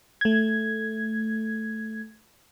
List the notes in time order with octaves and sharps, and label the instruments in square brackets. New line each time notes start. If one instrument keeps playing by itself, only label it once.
[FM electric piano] A3 G#6